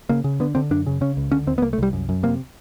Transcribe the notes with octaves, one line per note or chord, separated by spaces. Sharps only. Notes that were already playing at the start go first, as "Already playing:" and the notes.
C#3 A#3
C#3
D3 B3
D3 C4
F#2 D4
C#3
C#3 C#4
C#2
D3 C#4
D#2 C4
B3
C2 A#3
A3
C2 G3
F#2
F#2
C3 A#3